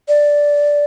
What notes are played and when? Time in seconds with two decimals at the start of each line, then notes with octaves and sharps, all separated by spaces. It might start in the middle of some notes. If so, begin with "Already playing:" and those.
0.08 D5